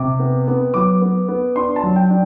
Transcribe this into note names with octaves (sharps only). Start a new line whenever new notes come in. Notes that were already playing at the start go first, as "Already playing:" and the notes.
Already playing: C3 D6
B3
B3
F#3 D6
B3
B3
D4 C6
A5
F#3
G5
D4